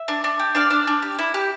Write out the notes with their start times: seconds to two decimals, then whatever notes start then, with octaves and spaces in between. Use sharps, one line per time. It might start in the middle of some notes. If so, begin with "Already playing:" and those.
Already playing: E5
0.08 D4
0.24 D4
0.39 G4
0.55 D4 D5 F5
0.70 D4
0.87 D4
1.02 G4
1.19 E4
1.34 G4